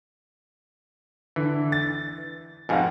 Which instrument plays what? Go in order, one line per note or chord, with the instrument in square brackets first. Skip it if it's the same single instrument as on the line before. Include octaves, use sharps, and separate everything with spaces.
[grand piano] D3 [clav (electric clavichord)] E3
[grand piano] A6
[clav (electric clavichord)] F2 G#2 B2 [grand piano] F5 F#5 G#5